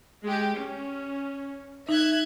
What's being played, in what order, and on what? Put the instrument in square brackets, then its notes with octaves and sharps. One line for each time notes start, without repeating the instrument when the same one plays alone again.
[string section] G#3 G4
C#4
[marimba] D#4 [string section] E5 F#6 G#6